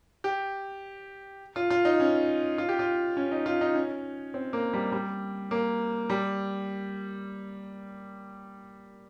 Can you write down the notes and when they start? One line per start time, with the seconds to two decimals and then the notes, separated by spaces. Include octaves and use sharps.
0.24 G4
1.56 F4
1.70 F4
1.85 D#4
2.00 C#4
2.58 F4
2.69 G4
2.79 F4
3.17 C#4
3.32 D#4
3.46 F4
3.61 D#4
3.75 C#4
4.34 C4
4.53 A#3
4.73 G3
4.92 G3
5.51 A#3
6.10 G3